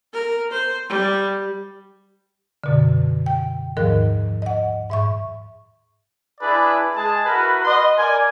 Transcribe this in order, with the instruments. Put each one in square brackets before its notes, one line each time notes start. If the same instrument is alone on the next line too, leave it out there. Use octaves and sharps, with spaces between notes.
[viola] A#4
C5
G3
[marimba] F#2 B2 D3
G5
D#2 G#2 D#3 F3 A#4 F#6
D#5 F#5
G#2 E5 C#6
[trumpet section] D4 E4 G#4 B4 D5
G#3 G#4 A5
E4 F#4 A#4 B4
B4 D#5 F#5 C6
A#4 D5 G#5